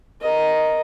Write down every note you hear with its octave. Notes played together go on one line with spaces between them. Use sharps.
A#4 D#5